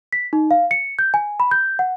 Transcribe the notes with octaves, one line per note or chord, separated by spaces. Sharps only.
B6
D#4
F5
C#7
G6
G#5
B5
G6
F#5